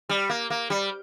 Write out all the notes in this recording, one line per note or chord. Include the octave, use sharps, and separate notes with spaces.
G3
A#3
A#3
G3